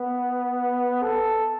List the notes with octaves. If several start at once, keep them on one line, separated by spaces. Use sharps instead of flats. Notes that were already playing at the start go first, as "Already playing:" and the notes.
Already playing: B3
A4